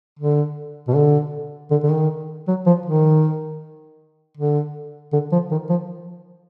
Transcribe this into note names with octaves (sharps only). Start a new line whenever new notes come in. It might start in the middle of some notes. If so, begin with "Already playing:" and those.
D3
B2
D3
D3
D3
D#3
F#3
F3
D#3
D3
D3
F3
D#3
F3